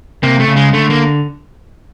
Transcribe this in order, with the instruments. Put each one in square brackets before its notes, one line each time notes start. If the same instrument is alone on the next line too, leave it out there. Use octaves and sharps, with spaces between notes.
[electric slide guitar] C3 [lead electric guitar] A#3
[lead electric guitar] A3
[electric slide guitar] C#3
[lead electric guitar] G#3
[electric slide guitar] D3 [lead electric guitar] A3
[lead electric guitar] A#3